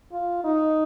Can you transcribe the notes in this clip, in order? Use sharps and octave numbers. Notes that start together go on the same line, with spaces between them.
F4
D#4